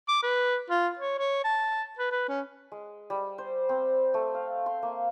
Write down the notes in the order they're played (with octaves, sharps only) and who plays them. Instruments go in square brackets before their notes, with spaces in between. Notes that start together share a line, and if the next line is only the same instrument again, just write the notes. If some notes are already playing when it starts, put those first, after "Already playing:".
[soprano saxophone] D6
B4
F4
C#5
C#5
A5
B4
B4
C#4
[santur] G#3
G3
C5
C4
A3
F5
C6
A#3